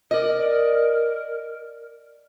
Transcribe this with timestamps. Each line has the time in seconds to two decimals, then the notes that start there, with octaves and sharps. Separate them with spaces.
0.11 A#4 D5 D#5